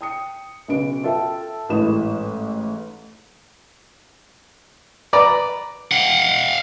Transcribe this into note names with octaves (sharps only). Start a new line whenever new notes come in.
G5 D#6 C#7
B1 C#3 B4 D7
F4 A4 E5 G5 A5
A1 G#2 E4 B4 D#6 E7
B4 D5 A#5
F5 F#5